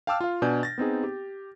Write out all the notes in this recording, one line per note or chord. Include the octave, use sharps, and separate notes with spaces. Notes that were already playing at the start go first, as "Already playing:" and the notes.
F5 G5 A5 D6 E6 F6
F4 F5
B2 D4 D5 G#5 G6
A6 A#6
B3 C4 D#4 G#4
G4